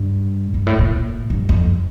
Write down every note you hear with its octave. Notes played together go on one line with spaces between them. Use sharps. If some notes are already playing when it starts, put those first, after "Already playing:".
Already playing: G2
G2
A2
A#2
G2
F2